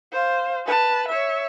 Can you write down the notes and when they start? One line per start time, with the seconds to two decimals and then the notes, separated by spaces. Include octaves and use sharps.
0.12 C5 F5
0.66 B4 A5
1.09 C#5 E5